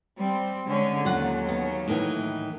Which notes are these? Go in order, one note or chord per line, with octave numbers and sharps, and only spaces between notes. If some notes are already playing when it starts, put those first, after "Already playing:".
G3 C4
D3 G#3 C#4
D#2 F#3 F4 F#5
B3
A2 D#3 E3